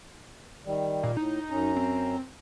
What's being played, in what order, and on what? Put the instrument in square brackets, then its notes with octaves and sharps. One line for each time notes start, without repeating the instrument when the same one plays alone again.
[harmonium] D#3 G3
[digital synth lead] A#2
[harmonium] A2 [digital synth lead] D#4
[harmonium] F#2 C#4 A#5
[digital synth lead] C4